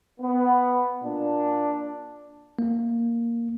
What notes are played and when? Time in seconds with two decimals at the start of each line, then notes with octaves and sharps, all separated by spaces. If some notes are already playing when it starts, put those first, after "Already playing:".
0.20 B3
1.03 A#2 D4
2.59 A#3